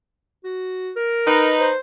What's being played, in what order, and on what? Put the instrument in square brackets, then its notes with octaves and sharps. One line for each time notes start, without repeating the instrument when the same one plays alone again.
[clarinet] F#4
A#4
[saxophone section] D#4 B4
[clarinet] C5